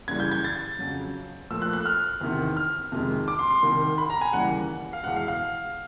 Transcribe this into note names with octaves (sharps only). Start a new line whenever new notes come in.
F#2 C#3 E3 G3 G#6
G6
G#6
A6
F2 C#3 F#3
A#2 F3 A3 E6
F#6
F#6
F6
E2 C3 D#3
F6
F2 C3 D#3 G#3
D6
C6
C6
C2 C3 D#3
B5
A#5
G#5
D#2 C#3 E3 G3 F#5
F5
E2 B2 G#3 F#5
F5
F5